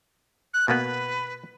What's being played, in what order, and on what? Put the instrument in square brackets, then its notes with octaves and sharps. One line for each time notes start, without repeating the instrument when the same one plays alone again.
[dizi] F#6
[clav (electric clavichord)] B2 A#3 B3 [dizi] B4